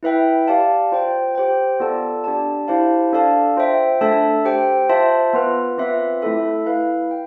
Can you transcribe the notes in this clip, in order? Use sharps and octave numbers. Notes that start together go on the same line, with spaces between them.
E4 B4 E5 G5
G4 D5 F5 A5
F4 C5 G5
G4 C5 G5
B3 F4 A4 D5 A5
D4 G4 D5 A5
E4 G4 C5 F5 A5
D4 A4 D5 F5 A5
F4 C5 E5 G5
A3 D4 A4 E5 A5
G4 C5 G5
F4 C5 E5 A5
B3 F4 B4
C4 F4 B4 E5
A3 E4 A4 E5
E4 B4 F5
G5